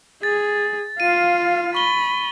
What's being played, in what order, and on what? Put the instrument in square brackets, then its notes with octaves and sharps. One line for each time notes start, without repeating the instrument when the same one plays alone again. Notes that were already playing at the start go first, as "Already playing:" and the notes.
[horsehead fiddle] G#4 [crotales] A6
[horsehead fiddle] F4 F5 [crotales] D#7
[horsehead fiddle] B5 [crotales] C#6 G7